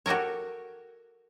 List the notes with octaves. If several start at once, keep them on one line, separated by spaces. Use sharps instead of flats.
F#4 G4 A4 A#4 C#5